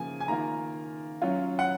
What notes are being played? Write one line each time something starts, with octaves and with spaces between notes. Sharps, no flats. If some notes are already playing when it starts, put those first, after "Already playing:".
Already playing: C#3 F3 A#3 G#5
G#5
D#3 A#3 F4 A#5
F#3 C#4 F4
F#5